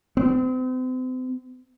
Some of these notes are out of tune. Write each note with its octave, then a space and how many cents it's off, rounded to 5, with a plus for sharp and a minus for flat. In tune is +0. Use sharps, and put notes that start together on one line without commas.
C4 -40